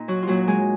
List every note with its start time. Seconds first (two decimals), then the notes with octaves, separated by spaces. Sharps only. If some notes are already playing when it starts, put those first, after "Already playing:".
Already playing: A#2 D#4
0.08 F#3 F#4
0.22 F4
0.27 A#2 F#3 F#4
0.47 G#3 G#4